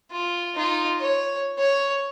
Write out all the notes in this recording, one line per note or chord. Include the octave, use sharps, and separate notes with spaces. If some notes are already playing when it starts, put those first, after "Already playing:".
F4
D#4 F4
C#5
C#5